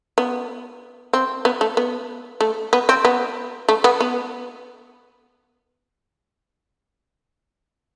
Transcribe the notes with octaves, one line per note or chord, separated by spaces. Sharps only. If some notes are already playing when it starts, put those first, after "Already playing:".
B3
C4
B3
A3
B3
A3
B3
C4
B3
A3
B3
B3